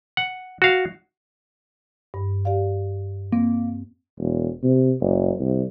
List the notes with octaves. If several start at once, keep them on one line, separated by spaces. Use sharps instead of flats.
F#5
F#4 F5
G2
G4 D5 F5
A#3 C4
E1
C3
F#1
C2